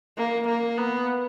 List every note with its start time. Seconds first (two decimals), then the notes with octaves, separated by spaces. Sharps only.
0.17 A#3
0.47 A#3
0.77 B3